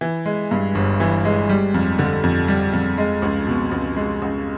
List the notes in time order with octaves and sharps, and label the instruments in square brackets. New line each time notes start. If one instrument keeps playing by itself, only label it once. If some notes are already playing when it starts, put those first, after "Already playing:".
[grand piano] E3
G#3
G2
G1
E3
G#3
G3
F2
D3
F2
G3
F2
G#3
C#2
B2
C#2
G#3
C#2